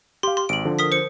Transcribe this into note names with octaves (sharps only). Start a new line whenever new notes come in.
G4 F5 C6
C6
G#1 D7 F#7
D3 F3
A#4 D#6 B6
C5 C#7